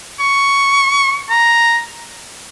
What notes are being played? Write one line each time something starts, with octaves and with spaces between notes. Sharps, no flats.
C#6
A#5